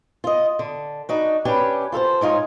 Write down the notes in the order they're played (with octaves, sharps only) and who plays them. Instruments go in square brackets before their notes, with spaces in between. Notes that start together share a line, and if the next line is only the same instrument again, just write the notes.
[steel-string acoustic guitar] F4 D#5
D3
D4 D#4 F#4
C#4 D4 G4 B4
F4 A4 A#4 C5
G#2 D#4 F4 C#5